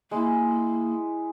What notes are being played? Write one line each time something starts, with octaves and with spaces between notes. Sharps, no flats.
G#3 A#3 E4